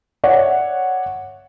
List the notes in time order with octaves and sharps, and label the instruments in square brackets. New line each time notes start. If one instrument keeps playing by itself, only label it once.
[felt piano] C#5 D5 E5 F#5